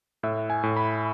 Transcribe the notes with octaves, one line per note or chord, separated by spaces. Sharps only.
A2 E5
G#5
A2
B5